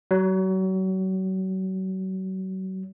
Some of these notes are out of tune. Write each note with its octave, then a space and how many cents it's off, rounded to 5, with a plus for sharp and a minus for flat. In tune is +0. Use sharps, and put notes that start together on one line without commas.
F#3 +35